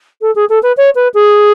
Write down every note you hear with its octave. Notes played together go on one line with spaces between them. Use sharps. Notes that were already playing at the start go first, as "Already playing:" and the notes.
A4
G#4
A4
B4
C#5
B4
G#4